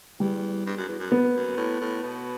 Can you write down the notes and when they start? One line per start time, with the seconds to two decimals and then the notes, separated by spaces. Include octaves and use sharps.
0.20 E2 G3
0.66 G2
0.77 F#2
0.88 E2
0.99 F#2
1.12 B3
1.35 F#2
1.57 A2
1.80 A2
2.03 B2